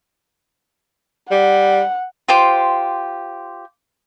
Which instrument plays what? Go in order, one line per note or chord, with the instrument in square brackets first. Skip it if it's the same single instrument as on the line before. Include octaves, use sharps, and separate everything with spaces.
[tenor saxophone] G3 [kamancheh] F#5
[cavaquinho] F4 G4 C5 D6